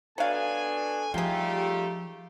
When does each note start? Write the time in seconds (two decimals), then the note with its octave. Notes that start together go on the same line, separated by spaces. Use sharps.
0.18 B2 F#3 D4 A4 F5 G#5
1.14 F3 G3 A3 D#4 F4 G4 G#4 G5